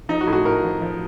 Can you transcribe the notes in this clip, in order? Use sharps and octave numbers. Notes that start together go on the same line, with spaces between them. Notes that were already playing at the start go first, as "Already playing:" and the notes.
F3 D#4
F#4
A2
F#4
A2 A#4
F3
F3